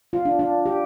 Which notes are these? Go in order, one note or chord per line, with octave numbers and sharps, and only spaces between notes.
F4
D4
D4
G4